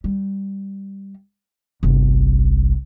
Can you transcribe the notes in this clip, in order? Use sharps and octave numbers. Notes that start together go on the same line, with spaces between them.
G3
G1 C2